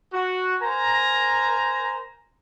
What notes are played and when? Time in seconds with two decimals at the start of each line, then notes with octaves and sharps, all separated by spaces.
0.13 F#4
0.62 A#4 C5 G#5 A#5